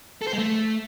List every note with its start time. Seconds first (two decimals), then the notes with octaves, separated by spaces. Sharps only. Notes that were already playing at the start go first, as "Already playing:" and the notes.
0.22 A4
0.27 C5
0.33 G#3
0.38 A3